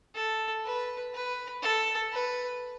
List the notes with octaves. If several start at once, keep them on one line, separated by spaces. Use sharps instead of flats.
A4
B4
B4
A4
B4